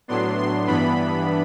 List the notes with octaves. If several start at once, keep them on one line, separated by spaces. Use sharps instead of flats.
A2 F#3 B3 D4 C6
C6
G2 E3 B3 D4 B5